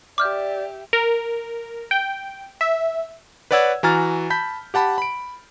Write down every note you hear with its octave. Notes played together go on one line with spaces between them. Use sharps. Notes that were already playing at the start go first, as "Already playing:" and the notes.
G4 D5 E5 D6 F6 G6
A#4
G5
E5
B4 C#5 D5 F#5 E6 G#6
E3 F#4 G#5 A#5 F6 A6
A5 B5 G6 B6
G4 F#5 A5 B5
B5 D7